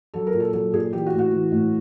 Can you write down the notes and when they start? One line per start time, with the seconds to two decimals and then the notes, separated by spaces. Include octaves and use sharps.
0.14 F#3 A4
0.27 A#4
0.33 A#2
0.40 A4
0.53 F#3 A4
0.72 A#2 G#4
0.92 E3 G4
1.06 F#4
1.13 A2
1.19 F#4
1.32 E3
1.52 A2